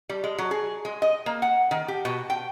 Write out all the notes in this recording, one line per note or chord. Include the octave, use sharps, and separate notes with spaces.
G3
G#3
F#3
G#4
G#3
D#5
A#3
F#5
D#3
G4
B2
G5